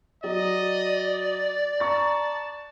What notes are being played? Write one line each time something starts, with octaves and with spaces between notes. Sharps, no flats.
F#3 D5 D#5
A5 A#5 C#6 A6